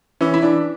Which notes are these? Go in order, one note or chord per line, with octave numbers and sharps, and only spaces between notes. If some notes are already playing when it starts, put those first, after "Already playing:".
E3 C#4
E4
E3 D4